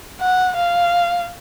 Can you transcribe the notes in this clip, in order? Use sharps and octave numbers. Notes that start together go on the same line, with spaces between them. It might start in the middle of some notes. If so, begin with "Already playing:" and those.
F#5
F5